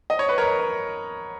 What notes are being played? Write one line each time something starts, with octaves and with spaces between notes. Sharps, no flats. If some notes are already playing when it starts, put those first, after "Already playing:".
D#5
C#5
B4
A#4 C#5